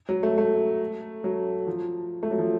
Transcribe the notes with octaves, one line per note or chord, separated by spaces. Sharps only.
F#3
A3
A3
F#3
F3
A3
F#3
F3